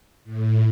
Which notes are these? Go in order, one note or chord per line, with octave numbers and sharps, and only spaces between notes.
A2